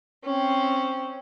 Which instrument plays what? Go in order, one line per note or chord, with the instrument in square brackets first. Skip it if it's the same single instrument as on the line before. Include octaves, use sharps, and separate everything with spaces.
[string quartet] C4 C#4